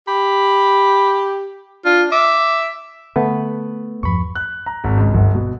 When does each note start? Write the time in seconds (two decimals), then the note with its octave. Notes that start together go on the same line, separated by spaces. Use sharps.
0.08 G4 B5
1.85 D4 F4
2.12 E5 D6
3.16 D3 A3 B3 B4
4.03 E2 G2 F3 B5 C#6
4.35 F#6
4.66 A#5
4.84 G#1
4.97 C#2
5.14 G1
5.35 B2